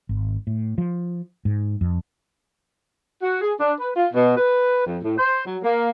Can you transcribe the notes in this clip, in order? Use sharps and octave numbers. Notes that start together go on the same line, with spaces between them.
G#1
A2
F3
G#2
F2
F#4
G#4
D4
B4
F4
B2
B4
F2
A2
C5
F#3
A#3